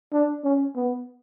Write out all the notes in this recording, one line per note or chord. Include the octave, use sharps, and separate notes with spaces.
D4
C#4
B3